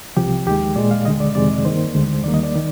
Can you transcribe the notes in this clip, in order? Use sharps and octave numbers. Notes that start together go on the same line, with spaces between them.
C2 C3 F3 G4
D#2 D#3 G#3 G4
A#2 G#3 D5
F5
D2 D3 G#3 D#5
D5
F2 C3 D#3 G#3 D5
G2 D#3 A#3 C5
D2 D3 G#3
D#2 D#3 G3 A#3 D5
D#5
D5
D#3